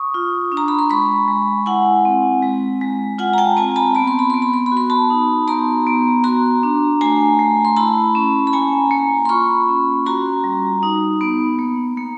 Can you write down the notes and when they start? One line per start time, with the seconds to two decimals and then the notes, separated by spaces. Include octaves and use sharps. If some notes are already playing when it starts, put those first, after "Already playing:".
Already playing: C#6 D#6
0.14 F4
0.52 D4
0.57 A#5
0.68 B5
0.79 C6
0.90 G#3 B5 C#6
1.28 G#3
1.66 E4 F#5 G#5
2.05 C4
2.42 G#3
2.81 G#3
3.19 F4 F#5 G#5
3.33 A#5
3.38 G5 A5
3.57 C4 G#5 A#5
3.76 A5 B5
3.95 B3 B5
4.07 C6
4.19 B5
4.30 B3 C6
4.42 B5
4.54 C6
4.66 B5
4.72 F#4
4.77 C6
4.90 A5 B5
5.10 D#4
5.48 B3 A#5 C6
5.87 B3
6.24 F#4 A#5 C6
6.63 D4
7.01 A3 G#5 A#5
7.39 A3
7.65 C6
7.76 E4 A5 B5
8.15 C#4
8.47 B5
8.53 A#3 G#5 A#5
8.91 A#3
9.25 C6
9.29 F4 B5 C#6
9.68 C#4
10.06 F#4 A#5 C6
10.44 G3
10.83 D#4
11.21 B3
11.59 A#3
11.97 A#3